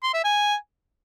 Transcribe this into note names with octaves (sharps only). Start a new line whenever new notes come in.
C6
E5
G#5